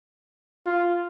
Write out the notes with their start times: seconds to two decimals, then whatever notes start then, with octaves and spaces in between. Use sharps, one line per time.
0.66 F4